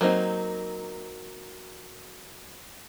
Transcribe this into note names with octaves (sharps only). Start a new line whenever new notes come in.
F#3 A#3 C4 D#4